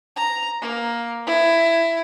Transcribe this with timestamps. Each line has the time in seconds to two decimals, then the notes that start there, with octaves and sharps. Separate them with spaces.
0.16 A#5
0.62 A#3
1.27 E4